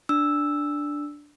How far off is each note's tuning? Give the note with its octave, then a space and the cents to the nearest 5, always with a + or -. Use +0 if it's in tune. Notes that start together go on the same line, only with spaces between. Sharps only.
D4 +0 E6 +0